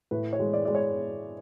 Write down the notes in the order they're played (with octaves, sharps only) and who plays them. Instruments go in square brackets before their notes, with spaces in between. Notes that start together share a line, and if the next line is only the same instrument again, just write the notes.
[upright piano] A2 B4
C#5
G#3
D5
G#3 D5
C#5